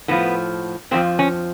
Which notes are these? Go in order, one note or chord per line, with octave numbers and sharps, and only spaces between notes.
A2 F3 B3
F2 D3 F3 C4
C#4